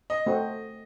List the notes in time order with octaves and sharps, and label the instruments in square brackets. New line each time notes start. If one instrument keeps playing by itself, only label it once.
[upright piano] D#5
[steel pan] A3 C4 F#4